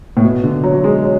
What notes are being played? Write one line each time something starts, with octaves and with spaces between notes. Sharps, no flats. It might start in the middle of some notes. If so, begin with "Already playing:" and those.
A2
B2
D3
F#3
F#3
G#3
F#3